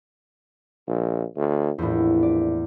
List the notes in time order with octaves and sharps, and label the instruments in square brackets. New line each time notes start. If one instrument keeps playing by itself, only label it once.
[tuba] A#1
D2
[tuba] A#1 [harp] E2 A2
[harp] D5